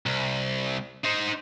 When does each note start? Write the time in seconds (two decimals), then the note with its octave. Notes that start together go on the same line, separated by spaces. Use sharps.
0.06 C2
1.05 D#4 C5